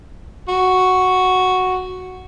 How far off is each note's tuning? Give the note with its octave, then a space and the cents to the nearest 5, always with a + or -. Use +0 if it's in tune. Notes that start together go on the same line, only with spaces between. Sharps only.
F#4 +0